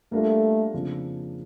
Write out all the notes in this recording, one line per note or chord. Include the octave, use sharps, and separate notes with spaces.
G3 A3 A#3 D4 F4 A#4
F2 C#3 F3 A#3 D4